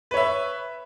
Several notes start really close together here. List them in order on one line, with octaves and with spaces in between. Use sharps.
B4 C#5 E5